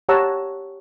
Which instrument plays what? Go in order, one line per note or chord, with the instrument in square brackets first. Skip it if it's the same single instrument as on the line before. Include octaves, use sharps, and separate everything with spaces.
[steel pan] G4 C#5 F#5 A5 A#5 E6